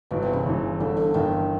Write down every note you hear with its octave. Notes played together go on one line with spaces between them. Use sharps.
G1 G2 B2 E3
C3
C#3
G1 G2 E3
G1 G2 D3 E3
D3
G1 G2 D#3 E3